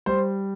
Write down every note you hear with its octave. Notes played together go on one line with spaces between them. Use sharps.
G3 C5